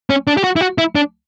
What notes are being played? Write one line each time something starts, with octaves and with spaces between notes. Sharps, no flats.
C#4
D4
G4
F#4
E4
F#4
E4
D4